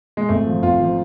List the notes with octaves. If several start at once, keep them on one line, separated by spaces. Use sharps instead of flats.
G#3
G#1 A3
F3
G#1 F4
F3